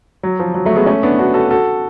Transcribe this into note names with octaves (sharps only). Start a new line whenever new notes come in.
F#3
F3
F#3
F#3 A3
G#3 B3
A3 C#4
B3 D4
D4 F#4
F#4 A4
F#4 A4